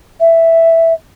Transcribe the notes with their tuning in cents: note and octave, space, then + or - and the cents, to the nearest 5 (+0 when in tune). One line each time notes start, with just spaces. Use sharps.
E5 +0